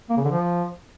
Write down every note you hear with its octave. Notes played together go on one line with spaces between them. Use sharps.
A#3
C#3
D3
F3